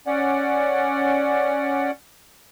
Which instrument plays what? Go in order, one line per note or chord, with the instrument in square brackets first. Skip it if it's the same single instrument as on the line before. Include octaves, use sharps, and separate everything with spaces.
[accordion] C#4 D5 F#5